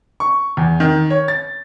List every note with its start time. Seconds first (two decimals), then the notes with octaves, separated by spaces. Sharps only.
0.20 C#6
0.57 E2
0.80 D#3
1.10 C#5
1.28 A6